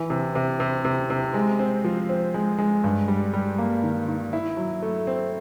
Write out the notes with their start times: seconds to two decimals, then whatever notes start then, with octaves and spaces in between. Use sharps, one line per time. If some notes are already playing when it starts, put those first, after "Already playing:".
Already playing: E3
0.10 C3
0.35 C3
0.60 C3
0.85 C3
1.10 C3
1.34 G#3
1.59 C4
1.84 F3
2.09 C4
2.34 G#3
2.58 G#3
2.84 G2
3.08 G3
3.33 G3
3.58 A#3
3.83 D#3
4.08 D#3
4.33 E4
4.57 F#3
4.82 A3
5.07 C4